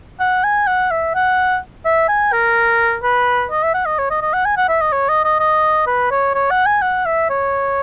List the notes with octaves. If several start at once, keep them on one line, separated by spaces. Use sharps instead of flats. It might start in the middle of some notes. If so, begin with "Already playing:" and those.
F#5
G#5
F#5
E5
F#5
E5
G#5
A#4
B4
D#5
E5
F#5
D#5
C#5
D#5
D#5
F#5
G#5
F#5
E5
D#5
C#5
D#5
D#5
D#5
B4
C#5
C#5
F#5
G#5
F#5
E5
C#5